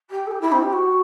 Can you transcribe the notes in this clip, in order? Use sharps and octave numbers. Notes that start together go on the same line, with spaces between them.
G4
A4
G4
E4
C4
G4
F#4